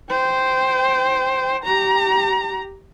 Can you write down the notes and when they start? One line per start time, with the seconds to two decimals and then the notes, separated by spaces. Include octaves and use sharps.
0.10 C5 G5
1.64 G4 A#5